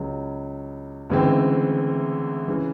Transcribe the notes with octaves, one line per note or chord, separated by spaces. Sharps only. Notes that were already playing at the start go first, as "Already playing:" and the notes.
Already playing: C#2 C#3 F#3
D2 C#3 E3 G#3 C4
C#3 E3